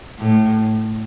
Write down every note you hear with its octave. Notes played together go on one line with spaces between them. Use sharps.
A2